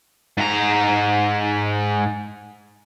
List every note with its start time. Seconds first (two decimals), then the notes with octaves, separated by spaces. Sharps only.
0.37 G#2 A#5